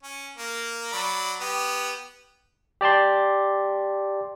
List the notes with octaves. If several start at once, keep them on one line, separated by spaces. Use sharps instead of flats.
C#4
A#3
F#3 D5 B5
B3 G4
G4 D5 A5 C6